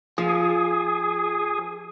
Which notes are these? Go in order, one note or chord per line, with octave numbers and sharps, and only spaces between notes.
F3 G#4